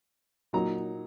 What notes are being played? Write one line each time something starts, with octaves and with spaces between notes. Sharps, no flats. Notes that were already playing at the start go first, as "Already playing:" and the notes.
A#2 F#3 A#3 D#4 A#5